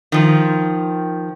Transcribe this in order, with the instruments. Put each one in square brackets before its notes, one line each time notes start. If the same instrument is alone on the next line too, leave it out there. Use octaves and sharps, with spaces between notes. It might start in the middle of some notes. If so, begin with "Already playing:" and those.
[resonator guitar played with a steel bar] D#3 F3